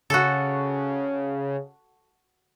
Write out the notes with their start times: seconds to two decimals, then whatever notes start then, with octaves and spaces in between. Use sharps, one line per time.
0.10 C#3 F#4 A4